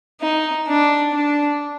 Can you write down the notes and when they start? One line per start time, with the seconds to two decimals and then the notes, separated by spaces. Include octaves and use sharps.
0.21 D#4
0.67 D4
1.13 D4